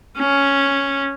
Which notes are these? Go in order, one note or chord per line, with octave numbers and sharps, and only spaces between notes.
C#4